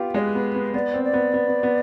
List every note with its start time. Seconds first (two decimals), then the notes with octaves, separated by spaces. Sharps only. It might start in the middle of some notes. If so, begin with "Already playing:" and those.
Already playing: B3 F4 G4
0.14 G#3 D5
0.19 B4
0.34 B3
0.54 B3
0.74 B3 D5
0.94 C4
1.04 D5
1.14 B3
1.34 B3
1.48 B3
1.63 B3